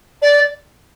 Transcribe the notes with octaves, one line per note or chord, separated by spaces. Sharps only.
D5